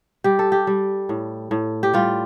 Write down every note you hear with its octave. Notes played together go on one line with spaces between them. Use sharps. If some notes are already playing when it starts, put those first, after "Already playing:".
G3 G4
A4
G4
G3
A2
A2
G4
G3 F4